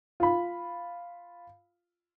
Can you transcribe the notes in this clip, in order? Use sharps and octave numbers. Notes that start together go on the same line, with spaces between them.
F4 B5